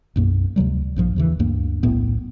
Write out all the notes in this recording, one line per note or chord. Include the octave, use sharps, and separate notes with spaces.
B1 F#2 A#3
D2 C3 F#3 G3
A#1 G2 F3
D#2 C#3 E3
D2 G2 A#3
D#1 B1 A2 B3